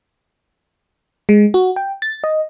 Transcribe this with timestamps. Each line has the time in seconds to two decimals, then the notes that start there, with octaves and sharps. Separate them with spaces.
1.29 G#3
1.54 F#4
1.76 G5
2.02 A6
2.24 D#5